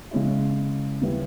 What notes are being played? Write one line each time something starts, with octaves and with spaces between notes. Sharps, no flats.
C#3 G#3 C#4 E4
D#2 C#3 G3 B3 E4